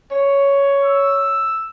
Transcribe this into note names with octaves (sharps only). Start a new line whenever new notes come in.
C#5
E6